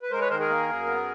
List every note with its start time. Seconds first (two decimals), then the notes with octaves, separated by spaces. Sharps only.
0.03 B4
0.11 G#3 A#4 C5
0.20 B4 C#5
0.30 D#3 A#4 C5
0.40 G#4 A#4
0.49 A#3
0.68 F#2
0.86 B3